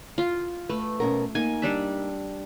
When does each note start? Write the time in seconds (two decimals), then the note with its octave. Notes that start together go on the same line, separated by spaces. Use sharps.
0.18 F4
0.69 A3 B4
1.00 B2 C#4 A#4
1.35 A#3 D#4 G#5
1.62 G3 D4 E5